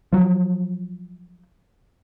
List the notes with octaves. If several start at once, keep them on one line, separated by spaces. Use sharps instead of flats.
F3 F#3